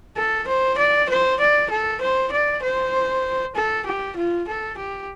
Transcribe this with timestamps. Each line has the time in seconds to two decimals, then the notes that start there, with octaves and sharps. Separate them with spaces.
0.17 A4
0.48 C5
0.78 D5
1.10 C5
1.40 D5
1.70 A4
2.01 C5
2.32 D5
2.63 C5
3.56 A4
3.87 G4
4.16 F4
4.48 A4
4.78 G4